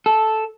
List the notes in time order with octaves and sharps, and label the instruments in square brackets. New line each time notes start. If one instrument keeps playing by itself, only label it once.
[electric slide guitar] A4